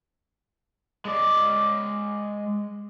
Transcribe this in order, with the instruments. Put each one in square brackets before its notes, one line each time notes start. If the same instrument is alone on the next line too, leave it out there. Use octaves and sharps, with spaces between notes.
[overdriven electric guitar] G#3 D5